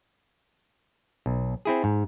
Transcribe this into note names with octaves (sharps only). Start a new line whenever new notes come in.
B1
C4 E4 G#4
G#2